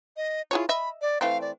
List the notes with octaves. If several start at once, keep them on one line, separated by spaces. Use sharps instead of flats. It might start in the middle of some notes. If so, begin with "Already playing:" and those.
D#5
E4 F4 G#4 C#5
D#5 E5 B5
D5
E3 A3 C4 F5
D5